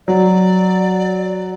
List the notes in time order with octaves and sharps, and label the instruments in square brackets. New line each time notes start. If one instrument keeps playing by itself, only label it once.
[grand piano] F#3 [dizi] D5